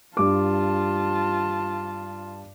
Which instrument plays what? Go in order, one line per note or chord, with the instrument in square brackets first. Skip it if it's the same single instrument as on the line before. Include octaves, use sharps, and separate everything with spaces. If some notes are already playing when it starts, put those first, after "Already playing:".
[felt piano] G2 D6 [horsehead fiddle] F4 A5